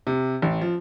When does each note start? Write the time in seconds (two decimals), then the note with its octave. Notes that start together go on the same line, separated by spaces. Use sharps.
0.07 C3
0.42 A1
0.61 F3